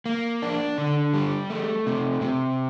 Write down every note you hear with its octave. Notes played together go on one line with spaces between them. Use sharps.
A#3
D4
D3
G3
A3
C3
C3